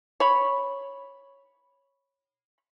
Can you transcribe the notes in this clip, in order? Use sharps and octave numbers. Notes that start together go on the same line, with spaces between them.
C#5 B5